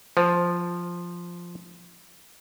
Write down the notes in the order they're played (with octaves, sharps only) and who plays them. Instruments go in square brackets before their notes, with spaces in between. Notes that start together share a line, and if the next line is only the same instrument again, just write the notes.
[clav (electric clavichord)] F3 [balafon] C5